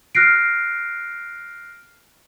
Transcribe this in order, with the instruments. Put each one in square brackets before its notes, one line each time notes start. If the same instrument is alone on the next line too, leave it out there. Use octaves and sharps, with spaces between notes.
[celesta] F6 F#6 A#6 C7 D7